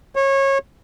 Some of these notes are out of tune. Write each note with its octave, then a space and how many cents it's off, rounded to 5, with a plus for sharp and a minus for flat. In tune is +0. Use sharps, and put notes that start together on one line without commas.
C#5 -25